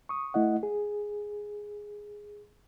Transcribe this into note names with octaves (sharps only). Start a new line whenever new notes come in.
C#6 D#6
A3 E4 D#5 F#5
G#4